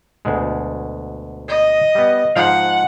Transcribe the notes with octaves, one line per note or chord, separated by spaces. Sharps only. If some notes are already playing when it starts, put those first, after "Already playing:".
D2 B2 G#3
D#5
G3 B3
G#2 F3 F5 F#5